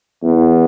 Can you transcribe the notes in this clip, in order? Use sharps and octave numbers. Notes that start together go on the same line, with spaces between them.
E2